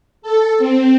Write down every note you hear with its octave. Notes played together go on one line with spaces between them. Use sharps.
A4
C4